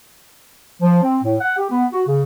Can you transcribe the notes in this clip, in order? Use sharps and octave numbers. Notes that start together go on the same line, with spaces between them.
F3
C4
A2
F#5
G4
B3
F#4
C#3